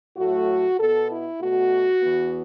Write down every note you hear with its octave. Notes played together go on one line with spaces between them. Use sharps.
A2 F#3 A3 F#4
B2 B3 A4
E4
B2 A3 F#4
E2 E3 B3